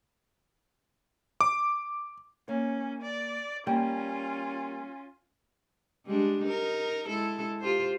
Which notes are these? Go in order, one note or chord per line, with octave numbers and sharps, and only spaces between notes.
D6
A#3 C#4 C#5
D5
G3 A#3 C#4 F4 G5
G3 G#3 D4
D#4 A#4
G#3 E4 A4
F4 G4 C5